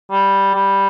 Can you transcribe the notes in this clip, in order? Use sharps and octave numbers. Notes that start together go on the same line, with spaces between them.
G3
G3